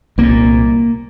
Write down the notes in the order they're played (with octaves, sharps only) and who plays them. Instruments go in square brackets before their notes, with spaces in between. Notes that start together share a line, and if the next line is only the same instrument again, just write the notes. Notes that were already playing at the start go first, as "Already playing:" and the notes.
[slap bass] C2 A#2 A#3